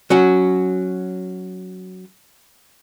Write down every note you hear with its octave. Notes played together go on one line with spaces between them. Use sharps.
F#3 C#4 F#4